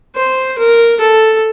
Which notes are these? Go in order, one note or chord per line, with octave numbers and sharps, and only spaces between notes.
C5
A#4
A4